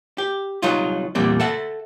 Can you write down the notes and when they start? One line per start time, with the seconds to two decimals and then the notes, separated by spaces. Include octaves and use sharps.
0.18 G4
0.62 C2 F#3 D#4 F4
1.15 E2 A#2 G3 C4
1.40 A4 E5 F#5